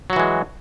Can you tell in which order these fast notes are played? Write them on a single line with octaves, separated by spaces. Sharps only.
F#3 F#4 E3 G#3